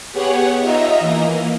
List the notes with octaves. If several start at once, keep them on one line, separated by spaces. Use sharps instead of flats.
B3 G4 G#4 C#5 F#5
D#4 F4 D#5 E5 A#5
E3 A#3